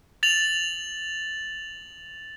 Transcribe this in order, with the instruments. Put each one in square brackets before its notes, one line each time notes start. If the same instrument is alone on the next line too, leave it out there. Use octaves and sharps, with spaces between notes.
[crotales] A6 F7 F#7